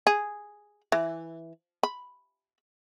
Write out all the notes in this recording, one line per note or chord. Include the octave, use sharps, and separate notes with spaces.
G#4
E3
B5